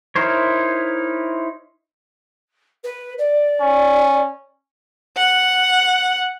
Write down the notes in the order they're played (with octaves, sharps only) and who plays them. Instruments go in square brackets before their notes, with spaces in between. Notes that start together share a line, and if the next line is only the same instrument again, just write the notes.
[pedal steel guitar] D#4 E4 A#4 C5 C#5
[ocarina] B4
D5
[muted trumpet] C#4
[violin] F#5